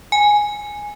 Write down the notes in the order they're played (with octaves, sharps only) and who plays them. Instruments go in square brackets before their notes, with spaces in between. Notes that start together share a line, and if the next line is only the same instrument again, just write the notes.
[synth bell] G#5